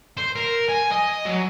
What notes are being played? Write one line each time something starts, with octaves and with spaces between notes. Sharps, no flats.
C5
A#4
G#5
D#5
F#3